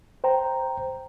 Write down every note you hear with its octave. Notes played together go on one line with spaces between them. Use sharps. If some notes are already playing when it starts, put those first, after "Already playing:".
C5 G5 A#5